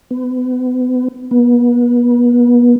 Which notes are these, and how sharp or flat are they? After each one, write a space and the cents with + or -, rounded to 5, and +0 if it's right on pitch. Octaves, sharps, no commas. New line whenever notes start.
B3 +35
B3 -35